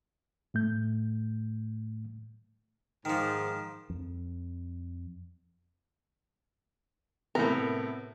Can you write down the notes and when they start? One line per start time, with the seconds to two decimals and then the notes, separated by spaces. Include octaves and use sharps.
0.54 A2 A3 G6
3.05 G#2 D#3 F3
3.90 F2
7.35 A2 C3 B3 A#4